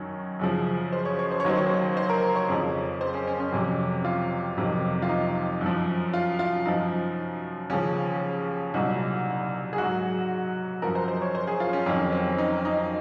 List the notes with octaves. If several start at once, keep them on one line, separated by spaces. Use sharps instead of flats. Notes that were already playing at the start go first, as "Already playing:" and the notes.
Already playing: F#2 D#3 F#3 C#5
F#2 C#3 F3
C5
C#5
C#5
C5
C#5
D#2 D#3 F#3 C5
C#5
C5
C5
A#4
C#5
F2 C#3 F3
C5
C#4
C#4
C#4
F2 C3 F#3
F4
F2 C3 D#3 F#3
F4
D#4
F#2 F3
F4
F4
F#2 F3 D#4
D#2 C#3 F3 C#4
C2 A#2 F#3 D#4
G#4
G#2 F#3 F#4
F#2 F3 A#4
C5
C5
C#5
C5
G#4
F4
C#4
F2 D#3 F#3 C#4
C4
D#4
D#4